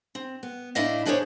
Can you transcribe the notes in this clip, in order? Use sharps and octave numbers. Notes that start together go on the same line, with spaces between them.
C4
B3
A2 D4 E4 D5 D#5 F5
E3 D4 G#4 A#4 C5 C#5